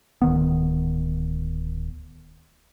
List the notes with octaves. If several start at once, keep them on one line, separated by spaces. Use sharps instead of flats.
D1 D#3 B3